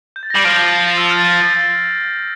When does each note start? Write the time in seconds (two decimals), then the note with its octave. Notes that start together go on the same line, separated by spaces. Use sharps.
0.16 G6
0.23 A6
0.30 A#6
0.36 G3 C7
0.45 F3 D7
0.98 E6
1.10 F6
1.17 A6
1.23 G6